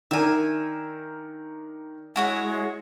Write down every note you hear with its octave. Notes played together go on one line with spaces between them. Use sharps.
D#3 D4 A#4 E5 G#5
G#3 E4 F#4 C#5